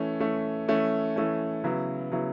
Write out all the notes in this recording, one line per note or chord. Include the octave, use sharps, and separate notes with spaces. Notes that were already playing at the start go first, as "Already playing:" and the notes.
Already playing: E3 A3 C#4
E3 A3 C#4
E3 A3 C#4
E3 A3 C#4
C#3 F#3 B3 E4
C#3 F#3 B3 E4